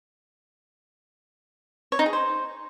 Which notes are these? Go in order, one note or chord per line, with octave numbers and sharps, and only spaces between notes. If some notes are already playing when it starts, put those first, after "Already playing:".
C#5
D#4
G#4
C5